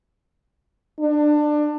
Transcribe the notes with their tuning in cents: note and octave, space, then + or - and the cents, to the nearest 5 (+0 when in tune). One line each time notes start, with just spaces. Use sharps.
D4 +20